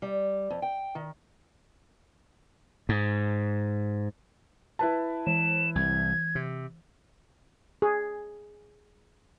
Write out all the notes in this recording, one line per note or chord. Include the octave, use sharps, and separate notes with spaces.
G3
F2
G5
D#3
G#2
E4 B4 A5
E3 E7
C2 G#6
C3
G#4